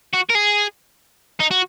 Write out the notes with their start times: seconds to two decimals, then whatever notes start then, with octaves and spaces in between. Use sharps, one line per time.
0.13 F#4
0.29 A#4
0.35 G#4
1.40 D#4
1.51 F#4